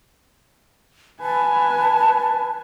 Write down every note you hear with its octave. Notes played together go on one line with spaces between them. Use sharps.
B4 G#5 A5